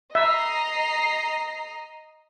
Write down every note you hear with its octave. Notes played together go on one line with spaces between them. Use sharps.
D#5 E5 A#5 C7